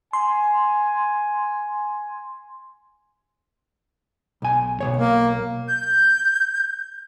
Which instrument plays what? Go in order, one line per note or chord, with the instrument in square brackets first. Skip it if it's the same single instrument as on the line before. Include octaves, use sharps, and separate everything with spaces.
[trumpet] G#5 [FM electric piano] C6
[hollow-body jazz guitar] B1 G#5
B1 C#3 C#5
[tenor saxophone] A#3
[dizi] G6